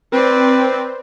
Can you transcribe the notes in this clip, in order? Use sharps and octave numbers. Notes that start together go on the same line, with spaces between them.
C4 B4 D5